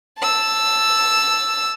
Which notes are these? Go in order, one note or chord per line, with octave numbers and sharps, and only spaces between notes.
A5 E6